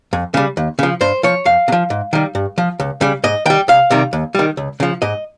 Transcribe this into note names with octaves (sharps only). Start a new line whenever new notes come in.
F2
C#3 G3
D#2
C#3 F3
G2 C5
F3 C#5
F2 F5
C3
F3
G#2
D#3 G3
G2
F3
C#2
C#3 G3
G#2 D#5
D#3 G3 G5
C2 F5
C3 D#3 G3
D#2
D#3 G3
C#2
C#3 F3
G#2 D#5